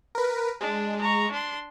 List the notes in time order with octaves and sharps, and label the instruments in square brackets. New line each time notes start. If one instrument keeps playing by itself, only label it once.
[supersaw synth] A#4 B4
[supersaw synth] G#3 [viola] D4
[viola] A#5 C#6
D4 C6